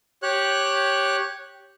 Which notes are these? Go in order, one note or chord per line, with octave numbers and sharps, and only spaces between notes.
G4 C#5 F#6